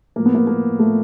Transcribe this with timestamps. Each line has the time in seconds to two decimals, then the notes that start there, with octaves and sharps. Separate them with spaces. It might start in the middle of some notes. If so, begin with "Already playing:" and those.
0.16 A2 F3 A#3
0.26 B3
0.35 A#3
0.47 A#3
0.79 A2 F3 A3